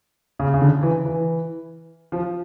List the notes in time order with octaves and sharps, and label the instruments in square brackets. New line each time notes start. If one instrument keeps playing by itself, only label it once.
[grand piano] C#3
C#3
D3
E3
E3
F3